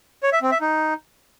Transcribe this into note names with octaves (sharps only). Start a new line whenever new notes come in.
C#5
E5
C4
E5
D#4